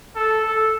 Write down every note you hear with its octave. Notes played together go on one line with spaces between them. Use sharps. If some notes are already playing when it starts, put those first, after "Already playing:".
A4
A4